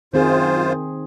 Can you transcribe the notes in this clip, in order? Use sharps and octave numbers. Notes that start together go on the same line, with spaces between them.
F#2 D#3 C4 F4 G#4 C5